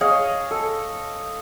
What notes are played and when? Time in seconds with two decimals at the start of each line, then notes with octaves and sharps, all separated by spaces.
0.01 G#4 C#5 D#5 F5
0.51 A4